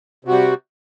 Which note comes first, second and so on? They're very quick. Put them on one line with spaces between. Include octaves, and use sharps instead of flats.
C3 F#4 G3